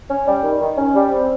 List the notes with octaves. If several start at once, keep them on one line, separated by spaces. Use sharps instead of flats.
C#4
G3
D#3
D#3
C#4
G3
C4